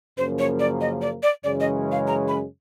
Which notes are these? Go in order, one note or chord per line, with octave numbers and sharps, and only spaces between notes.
F#2 C#3 F3 A#3 C5
C#5
D5
D#5
D5
D5
F#2 C#3 E3 G#3 C#4 D5
D#5
F5
A#5
B5